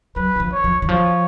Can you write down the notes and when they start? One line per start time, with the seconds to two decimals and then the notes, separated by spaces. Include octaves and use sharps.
0.16 F#3 B4
0.36 D#3
0.40 F3
0.52 C#5
0.64 F3
0.82 D#3
0.88 F3 C#5